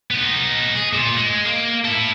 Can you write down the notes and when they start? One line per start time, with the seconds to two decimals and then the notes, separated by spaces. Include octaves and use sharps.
0.11 B3 D#4
0.75 G#4
0.93 A#2
1.17 G#3
1.46 A#3
1.85 E4 A4